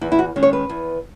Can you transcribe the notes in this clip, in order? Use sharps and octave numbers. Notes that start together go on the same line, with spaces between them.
E2 E4
E4
F#4
D#3 G#3 C#4
C#5
B4
E2